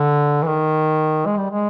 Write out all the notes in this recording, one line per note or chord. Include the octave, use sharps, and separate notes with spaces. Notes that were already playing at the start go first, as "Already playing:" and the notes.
Already playing: D3
E3
D#3
G#3
G3
G#3